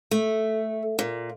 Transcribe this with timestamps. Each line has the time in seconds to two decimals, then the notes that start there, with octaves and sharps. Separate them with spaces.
0.11 A3
0.99 A#2